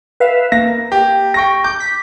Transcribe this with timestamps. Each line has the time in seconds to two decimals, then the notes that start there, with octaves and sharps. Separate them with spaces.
0.20 B4 E5 F5
0.52 A#3 A#6
0.92 G4
1.34 G5 C#6 A#6
1.64 D6 G6
1.80 B6